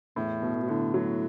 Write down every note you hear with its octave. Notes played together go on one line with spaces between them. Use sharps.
E2 A2
B2
A2
B2
A2 D3
A2 F#3